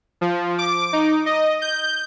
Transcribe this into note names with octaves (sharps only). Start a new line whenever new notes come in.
F3
D6
D#4
D#5
G6